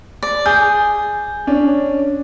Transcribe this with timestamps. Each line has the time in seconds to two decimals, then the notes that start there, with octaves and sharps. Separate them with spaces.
0.23 D5
0.46 G#4 G6
1.47 C#4 D4